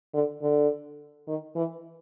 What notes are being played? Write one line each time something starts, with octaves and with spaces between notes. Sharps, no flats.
D3
D3
D#3
E3